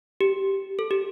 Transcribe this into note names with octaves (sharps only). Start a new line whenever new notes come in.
G4
A4
G4